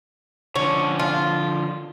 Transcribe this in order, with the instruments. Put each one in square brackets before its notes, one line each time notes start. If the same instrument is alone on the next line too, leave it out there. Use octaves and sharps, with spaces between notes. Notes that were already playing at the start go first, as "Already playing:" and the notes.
[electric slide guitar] D3 F3 [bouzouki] C#4
[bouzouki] F4